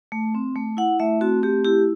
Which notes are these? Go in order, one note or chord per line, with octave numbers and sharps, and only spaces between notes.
A3
C4
A3
E4 F#5
A3 E5
C4 F#4
A3 G4
E4 G4